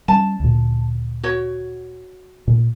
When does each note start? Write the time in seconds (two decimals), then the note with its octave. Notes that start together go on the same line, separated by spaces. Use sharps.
0.08 G3 C#4 A5
0.40 D2 A#2
1.23 F#4 C#5
2.48 A#2